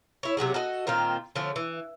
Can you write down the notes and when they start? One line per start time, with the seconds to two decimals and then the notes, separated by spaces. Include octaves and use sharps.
0.23 E4 C#5
0.37 C3 F#3 C#4 G#4
0.54 F#4 A4 D#5
0.87 A#2 D#3 C4 F4
1.36 D3 F3 A3 C#4
1.56 E3